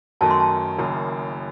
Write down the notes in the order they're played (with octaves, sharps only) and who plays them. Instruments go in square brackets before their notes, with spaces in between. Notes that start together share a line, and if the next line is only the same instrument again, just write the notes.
[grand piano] F#2 D#3 F#3 A3 [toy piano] A5
[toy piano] C6
A5
[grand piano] F#1 F#2 D#3